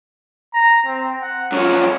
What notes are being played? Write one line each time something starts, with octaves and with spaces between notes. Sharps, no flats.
A#5
C4
F#5
F#2 F3 C#5